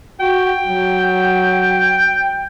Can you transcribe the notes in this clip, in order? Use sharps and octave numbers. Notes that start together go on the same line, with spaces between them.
F#4 G5
F#3